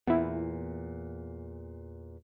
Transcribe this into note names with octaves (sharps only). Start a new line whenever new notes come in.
E2 A#2 B3 E4